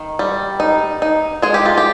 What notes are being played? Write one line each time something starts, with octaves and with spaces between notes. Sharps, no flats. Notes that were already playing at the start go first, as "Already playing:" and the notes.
Already playing: D#3
G3
D#4
D#4
G#3 G#4
G4
F4
G4